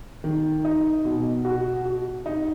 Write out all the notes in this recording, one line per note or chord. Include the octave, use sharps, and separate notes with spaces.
D#3
D#4
B2
F#4
F#4
D#4